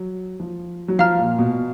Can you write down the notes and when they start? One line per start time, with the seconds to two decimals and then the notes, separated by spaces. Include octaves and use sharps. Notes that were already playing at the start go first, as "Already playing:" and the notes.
Already playing: F#3
0.40 F3
0.88 F#3
0.99 F3 F5 A#5 F6
1.19 A#2
1.39 B2